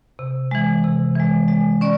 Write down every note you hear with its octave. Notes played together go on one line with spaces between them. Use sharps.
C3
E3 G#3
C3
E3 G#3
G#3
C#4 D5